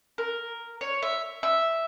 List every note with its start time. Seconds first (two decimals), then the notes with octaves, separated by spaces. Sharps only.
0.18 A#4
0.81 C#5
1.02 E5
1.43 E5